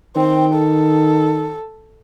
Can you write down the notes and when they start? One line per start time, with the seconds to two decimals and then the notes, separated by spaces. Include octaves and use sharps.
0.16 D#3 C4 G5
0.54 A4